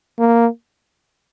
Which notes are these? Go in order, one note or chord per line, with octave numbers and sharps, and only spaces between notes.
A#3